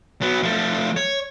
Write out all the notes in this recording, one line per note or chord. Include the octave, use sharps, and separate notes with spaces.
F#3 B3
F3 A3
C#5